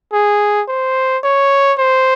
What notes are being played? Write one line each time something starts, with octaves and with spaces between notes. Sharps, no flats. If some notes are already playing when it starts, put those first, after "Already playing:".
G#4
C5
C#5
C5